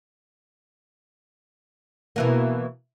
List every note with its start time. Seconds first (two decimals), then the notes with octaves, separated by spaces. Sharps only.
2.16 B2 E3 A#3